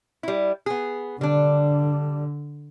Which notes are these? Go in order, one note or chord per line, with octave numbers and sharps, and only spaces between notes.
G3 E4
B3 G#4
D3 G3 D4